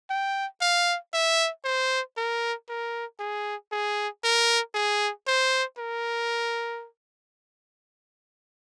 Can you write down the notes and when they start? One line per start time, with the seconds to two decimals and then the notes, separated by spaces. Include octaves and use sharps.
0.10 G5
0.61 F5
1.14 E5
1.64 C5
2.17 A#4
2.69 A#4
3.20 G#4
3.72 G#4
4.24 A#4
4.75 G#4
5.27 C5
5.78 A#4